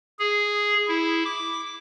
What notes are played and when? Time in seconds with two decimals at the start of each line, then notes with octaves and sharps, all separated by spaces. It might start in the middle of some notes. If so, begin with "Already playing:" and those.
0.19 G#4
0.88 E4
1.25 D6